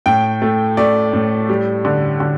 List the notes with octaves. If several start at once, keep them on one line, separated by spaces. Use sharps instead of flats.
A2 G5
A3
A3 D5
A2
G3
D3
D3